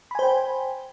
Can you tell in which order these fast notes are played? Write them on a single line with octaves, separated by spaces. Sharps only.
B5 G#5 C5 G5